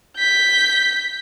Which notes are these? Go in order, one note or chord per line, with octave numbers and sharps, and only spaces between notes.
G6 B6